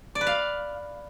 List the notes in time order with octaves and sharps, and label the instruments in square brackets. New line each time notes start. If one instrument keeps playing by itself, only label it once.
[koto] D5
B4
F5